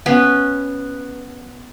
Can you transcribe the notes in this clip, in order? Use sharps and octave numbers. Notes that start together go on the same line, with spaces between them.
B3 C#4 B4